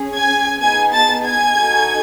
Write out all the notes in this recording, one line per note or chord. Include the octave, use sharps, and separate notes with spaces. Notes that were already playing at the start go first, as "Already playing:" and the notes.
Already playing: C#4 G#4
G#5 G#6
B3 D#4 G#4 G#5 G#6
A5 A6
G#5 G#6
D#4 F#4 A4